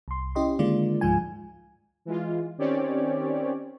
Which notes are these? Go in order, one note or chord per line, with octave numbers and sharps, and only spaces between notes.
C2 C6
C#4 E4 G4 D#5 C6
D3 D#3 G#3 A#3 F4 D5
C#2 G#2 F3 G#3 F4 G#5
E3 G#3 F4
D#3 C4 C#4 G4 C#5 D5